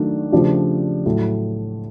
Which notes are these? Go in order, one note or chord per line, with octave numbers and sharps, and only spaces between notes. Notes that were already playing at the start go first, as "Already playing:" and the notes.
Already playing: D#3 F#3 A3 D4
C#3 F3 A3 D4 G4
A2 F#3 A3